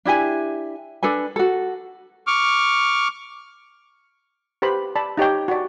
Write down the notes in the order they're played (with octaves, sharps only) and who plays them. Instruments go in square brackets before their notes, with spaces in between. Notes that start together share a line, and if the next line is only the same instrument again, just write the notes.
[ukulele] D4 E4 G4 G#5
D4 A4 B4 G#5
F#4 A4
[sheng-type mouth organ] C#6 D6 F6
[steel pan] G4 B4 C5 B5
D5 A5 B5
D#4 G4 C#5 G5
F#4 D5